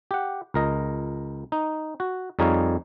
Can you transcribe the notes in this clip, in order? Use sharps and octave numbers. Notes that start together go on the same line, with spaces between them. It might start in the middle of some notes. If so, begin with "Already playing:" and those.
G4 F#5
C#2 A#4 D#5
D#4
F#4
F2 G3 D#4 G#4 C#5 F5